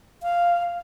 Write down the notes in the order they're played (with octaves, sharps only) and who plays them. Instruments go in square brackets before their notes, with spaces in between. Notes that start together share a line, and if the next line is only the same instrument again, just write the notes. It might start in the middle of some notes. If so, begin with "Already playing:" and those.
[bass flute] F5